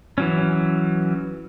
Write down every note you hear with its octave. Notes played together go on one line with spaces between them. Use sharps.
E3 F#3 C#4